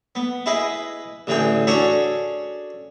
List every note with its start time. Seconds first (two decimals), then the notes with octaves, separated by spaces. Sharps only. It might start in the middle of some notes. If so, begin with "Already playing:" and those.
0.15 B3
0.46 E4 G#4 B4 D#5
1.27 A1 D3 E3 G#4 G5
1.67 C#4 D4 F#4 G#4 A4 C#5